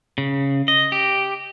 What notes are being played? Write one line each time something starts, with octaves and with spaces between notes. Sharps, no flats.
C#3
D#5
G4